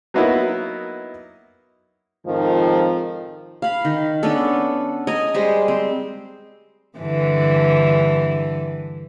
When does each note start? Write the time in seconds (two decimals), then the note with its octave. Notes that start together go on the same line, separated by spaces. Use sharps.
0.14 F#3 A#3 B3 D#4 E4
2.26 F2 G#2 D#3 F3
3.62 F5 B5
3.85 D#3
4.23 B3 C#4 D4 A4
5.07 D#5 G#5 A#5
5.34 G3 G#3 C5
5.68 C4
6.99 G2 D3 E3